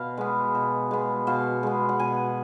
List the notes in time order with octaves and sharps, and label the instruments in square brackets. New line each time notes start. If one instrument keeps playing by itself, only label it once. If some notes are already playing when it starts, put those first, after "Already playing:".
Already playing: [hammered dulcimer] B2 F5
G#3 B3
B2
G#3 B3
B2 F5
G#3 B3
F#5
B2 G#5